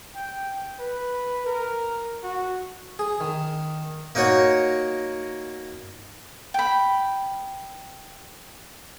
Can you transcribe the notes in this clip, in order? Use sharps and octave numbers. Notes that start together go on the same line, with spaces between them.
G5
B4
A#4
F#4
G#4
D#3
A#3 D#4 F#4 C#5 F#5
G5 B5